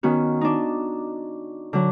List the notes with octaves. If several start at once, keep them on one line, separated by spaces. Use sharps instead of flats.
D#3 B3 C#4 F#4
D4 D#4
D3 F#3